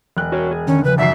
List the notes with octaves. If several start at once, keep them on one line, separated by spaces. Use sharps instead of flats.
E1 F#6
F#4 A#4 C#5
G#4
D3 D#3 C#4
C#3 F3 B4
G#1 F#2 E5 C7